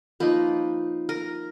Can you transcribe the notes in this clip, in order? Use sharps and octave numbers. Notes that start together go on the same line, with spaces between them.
F3 A#3 D#4 B4
A#4